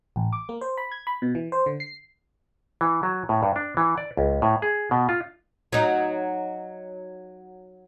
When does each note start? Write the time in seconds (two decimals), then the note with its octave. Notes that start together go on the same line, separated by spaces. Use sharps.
0.16 A1
0.33 D6
0.49 A#3
0.61 C5
0.78 B5
0.92 G#6
1.07 B5
1.22 B2
1.35 E3
1.52 C5
1.66 D3
1.80 C7
2.81 E3
3.03 F#3
3.29 A2
3.43 G2
3.56 D4
3.77 E3
3.98 D5
4.17 C#2
4.42 A2
4.62 G#4
4.91 B2
5.09 F4
5.72 F#3 D#4